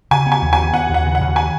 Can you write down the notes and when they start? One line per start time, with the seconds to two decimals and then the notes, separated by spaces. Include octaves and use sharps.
0.11 C#3 G#5
0.26 B3
0.32 G#5
0.42 D#2
0.53 G#5
0.58 B3
0.73 B3 F#5
0.89 D#2
0.94 F#5
1.04 C#3
1.15 F#5
1.21 D#2
1.36 G#5